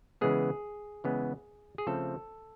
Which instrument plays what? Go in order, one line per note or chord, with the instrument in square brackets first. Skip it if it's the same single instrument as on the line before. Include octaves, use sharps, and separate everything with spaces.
[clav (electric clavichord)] C#3 E3 G#3 B3 G#4
C#3 E3 G#3 B3
G#4
C#3 F3 A3 C4 A4